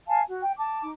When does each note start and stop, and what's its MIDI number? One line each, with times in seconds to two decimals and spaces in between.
0.08 0.21 77
0.08 0.21 80
0.08 0.21 81
0.26 0.41 66
0.42 0.52 79
0.57 0.81 81
0.57 0.81 86
0.81 0.90 63
0.81 0.90 86